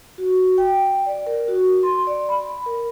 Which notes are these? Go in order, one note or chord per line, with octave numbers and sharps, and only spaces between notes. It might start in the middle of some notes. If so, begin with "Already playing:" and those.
F#4
G5
D5
A#4
F#4
C6
D5
B5
A#4